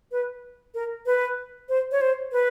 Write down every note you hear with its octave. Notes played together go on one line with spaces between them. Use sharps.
B4
A#4
B4
C5
C#5
C5
B4